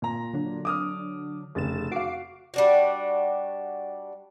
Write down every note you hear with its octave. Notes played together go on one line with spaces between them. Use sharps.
A#2 A#5
D3 F#3 D4
D6 D#6 F6
F1 C#3 G#4 A6 E7
F#4 F5 D6 C7 D7
G3 D4 F#4